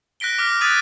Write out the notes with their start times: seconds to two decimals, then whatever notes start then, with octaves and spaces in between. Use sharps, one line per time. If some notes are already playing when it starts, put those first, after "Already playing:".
0.20 F#6 A#6 B6 D7 G7
0.39 D6 F6 B6
0.61 D#6 F#6 G#6 A6 B6 D#7